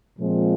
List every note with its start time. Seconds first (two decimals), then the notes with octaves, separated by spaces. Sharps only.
0.18 A#2 F3 G#3 C4